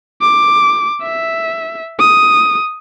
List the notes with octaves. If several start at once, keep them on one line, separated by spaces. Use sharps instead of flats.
D6
E5
D#6